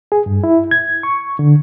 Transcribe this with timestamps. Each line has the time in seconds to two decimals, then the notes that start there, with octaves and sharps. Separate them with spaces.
0.12 G#4
0.26 G2
0.44 E4
0.71 G#6
1.03 C#6
1.39 D3